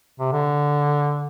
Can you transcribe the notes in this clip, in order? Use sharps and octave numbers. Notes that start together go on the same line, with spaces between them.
C3
D3